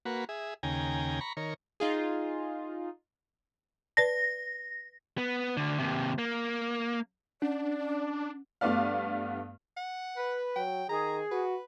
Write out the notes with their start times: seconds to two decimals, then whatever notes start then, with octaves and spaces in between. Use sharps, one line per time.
0.05 A#3 F#4 B4
0.29 G#4 E5
0.63 D#2 C#3 G5 G#5 A#5
1.21 A#5 B5 C#6
1.37 D#3 A#4 C#5
1.80 D#4 F4 G#4
3.97 B4 D5 A5 A#6
5.18 B3
5.57 D2 D3
5.79 D#2 C3
6.18 A#3
7.42 C#4 D4 D5
8.61 G2 A3 B3 D5 F5
9.77 F#5
10.17 B4
10.56 F#3 G5
10.89 D#3 G#4 A#5
11.31 F#4 B4